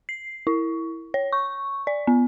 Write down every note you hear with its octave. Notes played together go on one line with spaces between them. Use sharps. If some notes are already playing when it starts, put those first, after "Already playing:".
C7
E4
C#5
C#6
D5
B3